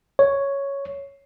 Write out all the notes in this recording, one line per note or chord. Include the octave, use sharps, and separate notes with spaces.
C#5